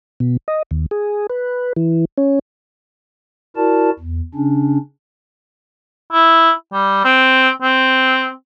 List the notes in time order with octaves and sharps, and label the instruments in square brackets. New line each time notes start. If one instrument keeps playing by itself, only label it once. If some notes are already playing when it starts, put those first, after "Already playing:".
[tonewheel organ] B2
D#5
D#2
G#4
B4
E3
C#4
[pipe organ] E4 F#4 A#4 D5 A5
E2
C#3 C#4 D4
[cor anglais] E4
G3
C4
C4